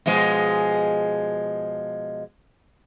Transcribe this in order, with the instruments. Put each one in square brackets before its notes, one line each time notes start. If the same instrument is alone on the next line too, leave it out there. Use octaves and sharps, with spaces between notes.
[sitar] B2 F3 G#3